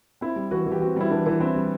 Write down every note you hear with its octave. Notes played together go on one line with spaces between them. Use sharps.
C4 E4
G3
E3 F#4
E3
G4
C4 F#4
G3 E4
E3 D4
E3 E4
C4 E4
G3